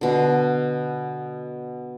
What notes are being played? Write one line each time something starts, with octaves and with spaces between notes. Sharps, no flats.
B2 D3